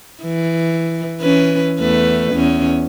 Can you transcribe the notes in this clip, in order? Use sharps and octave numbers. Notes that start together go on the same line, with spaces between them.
E3
E3 C#4 B4
E2 A3 B4
E2 C#4